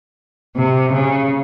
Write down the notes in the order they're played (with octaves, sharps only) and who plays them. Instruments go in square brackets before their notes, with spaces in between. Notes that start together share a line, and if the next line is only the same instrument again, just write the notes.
[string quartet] C3
C#3